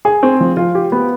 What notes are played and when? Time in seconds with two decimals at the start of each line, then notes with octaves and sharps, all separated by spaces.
0.05 G#4
0.23 C4
0.41 F3
0.57 F4
0.75 G4
0.92 B3